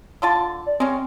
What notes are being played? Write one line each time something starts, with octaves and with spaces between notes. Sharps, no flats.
D3 F4 A5
D5
G#3 C4 C#4